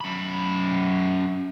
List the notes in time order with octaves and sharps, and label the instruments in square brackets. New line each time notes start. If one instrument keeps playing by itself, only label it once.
[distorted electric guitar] F#2 B5